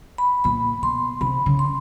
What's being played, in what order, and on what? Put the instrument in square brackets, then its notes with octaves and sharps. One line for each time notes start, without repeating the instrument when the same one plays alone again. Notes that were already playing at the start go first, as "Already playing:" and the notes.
[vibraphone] B5
[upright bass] A#2 [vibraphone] B5
[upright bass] B2 [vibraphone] C6
[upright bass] C3 [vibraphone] B5
[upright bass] C#3
[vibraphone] C6